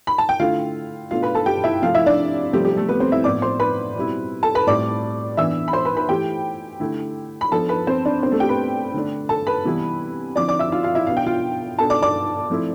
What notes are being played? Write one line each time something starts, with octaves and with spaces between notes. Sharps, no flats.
B5
A5
G5
D3 A3 E4 F4 F5
B2 A3 D4 F4 F5
B4 B5
A4 A5
G4 G5
E4 E5
C3 F3 A3 F4 F5
E4 E5
D4 D5
C3 F3 G3 A3 C4 G4
G3 G4
A3 A4
B3 B4
C4 C5
E4 E5
A2 F3 B3 E4 D5 D6
C5 C6
B4 B5
B2 G3 C4 E4
A4 A5
B4 B5
A2 G3 C4 E4 D5 D6
E3 B3 D4 E5 E6
B5
C5 C6
B4 B5
B4 B5
E3 A3 E4 G4 G5
D3 A3 E4
B5
F3 B3 D4 A4 A5
B4 B5
C4 C5
D4 D5
B2 B3 C4 D4 C5
A3 A4
G4 G5
B4 B5
D3 A3 D4
A4 A5
B4 B5
C3 E3 G3 B3 E4
D3 F3 C4 E4 D5 D6
D5 D6
E5 E6
F4 F5
F4 F5
E4 E5
B2 B3 D4 F5
G5
F4 F5
B2 B3 D4 A4 A5
D5 D6
D5 D6
F3 A3 C4 E4